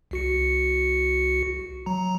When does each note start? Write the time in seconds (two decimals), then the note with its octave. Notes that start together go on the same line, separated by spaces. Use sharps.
0.11 C2 F#4 C#7
1.86 F#3 A#5